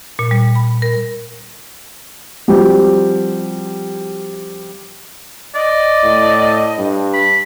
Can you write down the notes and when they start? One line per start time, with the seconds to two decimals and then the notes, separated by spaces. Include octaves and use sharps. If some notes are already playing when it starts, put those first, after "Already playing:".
0.19 A#2
0.31 G3
0.55 B5
0.82 A#4
2.48 F3 G3 C4 F#4 G4
5.55 D5 D#5
6.04 A2
6.78 G2
7.14 B5